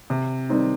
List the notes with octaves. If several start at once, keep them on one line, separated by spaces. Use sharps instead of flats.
C3
D#3 G3 C4 D#4